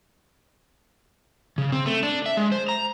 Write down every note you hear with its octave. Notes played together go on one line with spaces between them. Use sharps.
C#3
C4
A3
D4
E5
G#3
C5
A#5